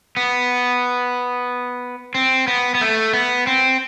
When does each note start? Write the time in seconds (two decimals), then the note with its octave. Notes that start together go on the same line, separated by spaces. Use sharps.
0.17 B3
2.15 C4
2.47 B3
2.75 B3
2.81 A3
3.13 B3
3.47 C4